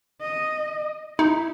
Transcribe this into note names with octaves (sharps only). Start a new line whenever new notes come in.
D#5
D#4 E4